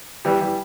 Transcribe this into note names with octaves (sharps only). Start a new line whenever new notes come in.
E3 G3
E3 G3